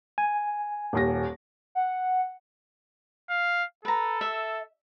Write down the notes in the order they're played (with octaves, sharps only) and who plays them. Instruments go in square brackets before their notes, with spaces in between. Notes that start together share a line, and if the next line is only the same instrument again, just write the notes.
[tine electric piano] G#5
[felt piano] D#1 D#2 A#6
[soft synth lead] F#5
[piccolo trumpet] F5
[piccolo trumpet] A4 [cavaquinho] B4 A#5
[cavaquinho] E5